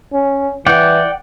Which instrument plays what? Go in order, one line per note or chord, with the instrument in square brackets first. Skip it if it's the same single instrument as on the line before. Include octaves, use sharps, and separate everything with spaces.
[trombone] C#4
[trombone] E3 [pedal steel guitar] D5 F#5 G5